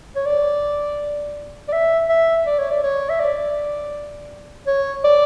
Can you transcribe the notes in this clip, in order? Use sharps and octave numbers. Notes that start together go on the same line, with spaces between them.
C#5
D5
D5
E5
E5
D5
C#5
D5
C#5
E5
D5
C#5
D5